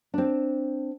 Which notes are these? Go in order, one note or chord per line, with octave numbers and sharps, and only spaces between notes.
C4 D4